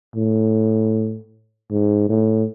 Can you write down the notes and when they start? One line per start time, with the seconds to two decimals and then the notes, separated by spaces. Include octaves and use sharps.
0.16 A2
1.70 G#2
2.09 A2